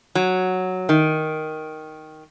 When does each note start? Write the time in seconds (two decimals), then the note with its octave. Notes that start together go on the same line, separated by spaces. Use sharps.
0.15 F#3
0.89 D#3